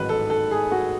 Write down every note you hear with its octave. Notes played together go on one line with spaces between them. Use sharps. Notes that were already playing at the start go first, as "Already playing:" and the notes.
Already playing: A1 G#2 D#3 F#3 B4
A4
A4
G#4
F#4